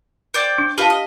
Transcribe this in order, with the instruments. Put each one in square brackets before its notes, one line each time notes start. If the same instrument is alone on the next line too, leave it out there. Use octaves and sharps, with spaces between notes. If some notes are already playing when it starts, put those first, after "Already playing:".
[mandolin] C5 D5 G5
[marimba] D4
[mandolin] F4 B4 D#5 [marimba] G4 F5 A5
[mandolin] D#5